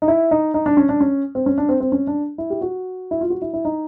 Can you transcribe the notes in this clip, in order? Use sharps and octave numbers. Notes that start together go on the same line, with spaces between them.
D#4
E4
D#4
D#4
D4
C#4
D4
C#4
C4
C#4
D4
C4
C4
C#4
D4
E4
G4
F#4
E4
F4
F#4
E4
E4
D#4